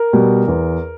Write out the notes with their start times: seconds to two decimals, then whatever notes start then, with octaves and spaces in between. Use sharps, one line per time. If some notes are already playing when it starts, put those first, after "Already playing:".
Already playing: A#4
0.13 B2 G3
0.48 E2